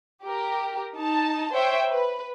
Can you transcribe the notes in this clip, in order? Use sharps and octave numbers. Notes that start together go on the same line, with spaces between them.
G4 A#4
D#4 A5
C5 C#5 E5 G5
B4